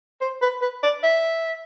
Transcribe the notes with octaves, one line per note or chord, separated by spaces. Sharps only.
C5
B4
B4
D5
E5